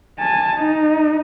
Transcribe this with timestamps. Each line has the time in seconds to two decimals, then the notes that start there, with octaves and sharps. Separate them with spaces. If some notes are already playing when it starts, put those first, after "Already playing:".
0.19 G#5 A5
0.56 D#4